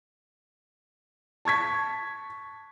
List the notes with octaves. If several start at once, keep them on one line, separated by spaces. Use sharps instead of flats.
A5 C#6 G#6 B6